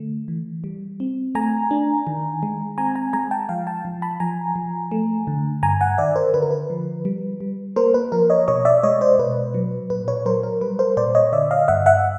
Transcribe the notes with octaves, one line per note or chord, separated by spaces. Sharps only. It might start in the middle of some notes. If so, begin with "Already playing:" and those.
Already playing: D3 A3
E3
G3
C4
A3 G#5 A#5
D4
D#3
G#3
C4 G#5 A#5
G#5 A#5
G#3 G#5 A#5
G5 A5
F3 F5 G5
G5 A5
F3
A5 B5
F3 G#5 A#5
F3
A3
D3
G2 G#5 A#5
F#5 G#5
D#3 D5 E5
A#4 C5
D3 B4
A#4
B4
F3
G3
G3
A#3 A#4 C5
B4
F3 A#4
C#5 D#5
B2 C#5 D#5
D5 E5
G#3 C#5 D#5
C5 D5
B2 B4
F#3
A#2 B4
B4 C#5
F#3 A#4 C5
A#4
G3 B4
A#4 C5
A#2 C5 D5
C#5 D#5
D3 D5 E5
D#5 F5
G2 E5 F#5
E5 F#5